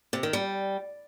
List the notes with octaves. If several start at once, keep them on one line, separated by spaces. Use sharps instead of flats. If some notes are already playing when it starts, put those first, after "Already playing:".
C3
D#3
G3